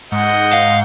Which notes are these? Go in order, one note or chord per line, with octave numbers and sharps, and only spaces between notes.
G#2 D#5 F#5 G6
F5